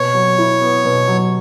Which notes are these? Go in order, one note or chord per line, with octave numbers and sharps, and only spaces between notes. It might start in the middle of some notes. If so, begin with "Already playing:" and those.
Already playing: B2 C#5
F#3
E4
B3
B2
F#3